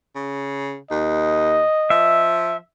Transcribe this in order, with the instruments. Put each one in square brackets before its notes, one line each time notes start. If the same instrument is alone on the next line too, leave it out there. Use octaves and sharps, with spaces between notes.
[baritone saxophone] C#3
[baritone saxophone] D#2 [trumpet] D#5
[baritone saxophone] F3 [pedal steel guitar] E5